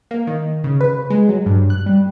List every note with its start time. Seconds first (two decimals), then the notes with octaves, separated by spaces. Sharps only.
0.11 A#3
0.27 D#3
0.64 C#3
0.81 B4
1.10 G#3
1.29 F#3
1.46 G2
1.70 F#6
1.86 G3